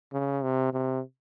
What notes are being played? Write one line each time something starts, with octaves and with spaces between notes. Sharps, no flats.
C#3
C3
C3